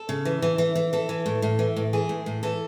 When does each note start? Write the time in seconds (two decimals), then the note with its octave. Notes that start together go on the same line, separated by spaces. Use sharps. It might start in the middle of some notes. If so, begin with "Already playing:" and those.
Already playing: A4
0.09 C#3
0.25 E3
0.42 E3
0.58 E3
0.75 E3
0.93 E3 A4
1.09 E3
1.26 A2
1.42 A2
1.59 E3
1.76 A2
1.93 E3 G#4
2.09 A2
2.26 A2
2.43 E3 A4